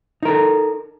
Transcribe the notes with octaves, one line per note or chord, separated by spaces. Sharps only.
D#4 A4 A#4